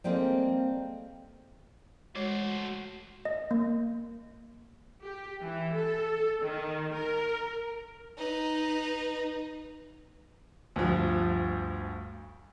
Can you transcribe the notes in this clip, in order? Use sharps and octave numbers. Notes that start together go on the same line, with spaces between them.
G3 A#3 C4 G#4 A4 D#5
G#3 A3 F#4 C5 C#5
D#5
A#3
G4
E3
A4
D#3
A#4
D#4 B4
D2 G2 F3